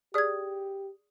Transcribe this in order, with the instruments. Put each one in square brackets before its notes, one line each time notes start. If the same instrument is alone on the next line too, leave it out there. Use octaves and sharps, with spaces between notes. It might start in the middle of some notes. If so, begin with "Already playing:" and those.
[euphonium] G4 [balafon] G#4 D5 [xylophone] D#6 G#6